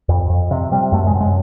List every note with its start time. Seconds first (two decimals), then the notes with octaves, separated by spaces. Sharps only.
0.09 F2
0.29 F2
0.51 C3
0.72 C3 G3
0.92 F#2 A3
1.07 G#3
1.14 F#2
1.21 G#3